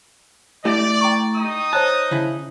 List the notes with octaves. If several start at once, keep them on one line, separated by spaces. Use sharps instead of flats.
A3 E4 G4 D5
G5 A#5 C#6
D#4 D#6
C5 C#5 A5 F#6
C#3 E4